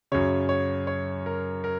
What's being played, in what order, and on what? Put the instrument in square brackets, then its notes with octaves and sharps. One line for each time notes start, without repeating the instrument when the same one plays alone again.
[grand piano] F#2 C#3 C#5
C#5
C#5
A#4
A#4